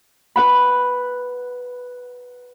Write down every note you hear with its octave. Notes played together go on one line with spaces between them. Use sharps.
B4 F#5 B5